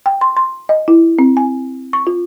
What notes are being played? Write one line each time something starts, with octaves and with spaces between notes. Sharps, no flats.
G5
C6
C6
D#5
E4
C4
G#5
C#6
F4